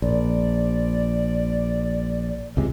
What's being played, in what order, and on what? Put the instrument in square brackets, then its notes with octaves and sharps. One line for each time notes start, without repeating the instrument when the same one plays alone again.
[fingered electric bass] A#1 [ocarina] D5
[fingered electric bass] C#2 C3 G#3